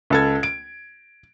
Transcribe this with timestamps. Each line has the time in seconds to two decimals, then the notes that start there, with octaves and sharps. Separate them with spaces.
0.10 C#2 A4 G#6
0.43 D7